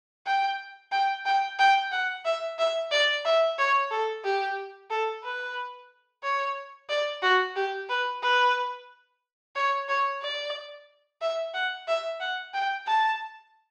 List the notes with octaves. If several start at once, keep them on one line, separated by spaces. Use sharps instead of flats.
G5
G5
G5
G5
F#5
E5
E5
D5
E5
C#5
A4
G4
A4
B4
C#5
D5
F#4
G4
B4
B4
C#5
C#5
D5
E5
F#5
E5
F#5
G5
A5